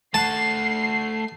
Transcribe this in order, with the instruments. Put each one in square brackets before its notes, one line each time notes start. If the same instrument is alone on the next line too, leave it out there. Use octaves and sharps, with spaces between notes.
[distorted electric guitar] A3 F#5 [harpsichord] A5 [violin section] C7